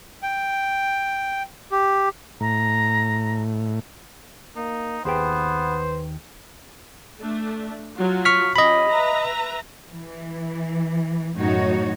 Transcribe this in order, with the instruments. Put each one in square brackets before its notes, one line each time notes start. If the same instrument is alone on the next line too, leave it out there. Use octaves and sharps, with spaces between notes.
[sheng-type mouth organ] G5
G4
[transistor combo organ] A2 [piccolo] A#5
[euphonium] A#3 [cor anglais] D#4
[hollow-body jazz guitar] D#2 G#4 G5 [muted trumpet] B3 [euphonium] B4 [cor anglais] C5
[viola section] A3 D4
F#3 F4
[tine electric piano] C#6 F6 B6
[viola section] C#4 F4 G4 [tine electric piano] D#5 B5
[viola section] B4 E5 A#5
[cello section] E3
F#2 A2 D#3 D#4 F#4 C#5